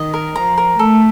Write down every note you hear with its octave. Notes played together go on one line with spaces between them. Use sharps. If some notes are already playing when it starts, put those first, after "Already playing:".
Already playing: D#3 D#5
A#4
F3 A#5
A#4
A3 A4